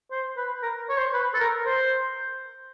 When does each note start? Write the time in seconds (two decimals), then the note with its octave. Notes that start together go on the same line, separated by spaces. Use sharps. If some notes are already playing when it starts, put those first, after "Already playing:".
0.11 C5
0.37 B4
0.63 A#4
0.89 C#5
0.97 C5
1.13 B4
1.34 A4
1.39 A#4
1.66 C5